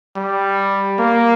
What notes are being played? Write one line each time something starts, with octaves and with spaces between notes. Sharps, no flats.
G3
A#3